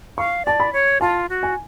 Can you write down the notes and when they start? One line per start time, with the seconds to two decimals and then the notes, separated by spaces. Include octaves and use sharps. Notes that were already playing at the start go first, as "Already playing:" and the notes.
0.18 F5 C#6
0.45 D5 A5
0.60 B5
0.73 C#5
1.01 F4 A5
1.29 F#4
1.43 G#5